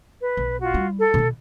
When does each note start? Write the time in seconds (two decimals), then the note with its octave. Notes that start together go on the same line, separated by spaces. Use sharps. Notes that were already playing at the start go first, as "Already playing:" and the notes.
0.21 B4
0.37 B1
0.60 F4 F#4
0.74 G3 E4
0.99 A4
1.14 B2 E3